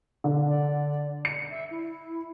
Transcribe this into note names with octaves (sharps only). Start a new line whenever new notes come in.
D3
D5
C#7
E5
E4